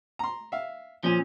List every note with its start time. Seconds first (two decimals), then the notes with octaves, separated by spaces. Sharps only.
0.19 A#5 C6
0.52 E5 F5
1.04 A#2 F3 C#4